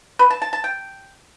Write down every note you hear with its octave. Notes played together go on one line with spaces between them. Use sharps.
B4
A5
A5
A5
G5